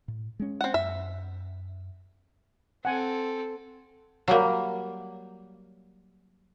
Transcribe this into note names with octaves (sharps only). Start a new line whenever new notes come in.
A2
G#3 C#4
C4 F#5
F#2 E5
C4 A4 F#5 G#5
F#3 G3 A#3